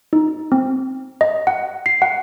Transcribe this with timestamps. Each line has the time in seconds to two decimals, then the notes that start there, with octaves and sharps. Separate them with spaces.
0.13 D#4
0.52 C4
1.21 D#5
1.47 F#5
1.86 C7
2.02 F#5